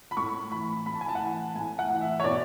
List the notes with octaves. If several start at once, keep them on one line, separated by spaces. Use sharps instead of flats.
B5
A2 C#6
E3 B5
A2 B5
A5
G#5
A5
F#5
E3 G#5
A2 G#5
F#5
E3
E5
C#5
B2 D5